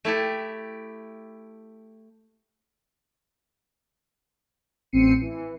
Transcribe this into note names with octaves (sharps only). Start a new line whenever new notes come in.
A3 E4 G4 A4
A1 C4 C7 C#7 D#7
E3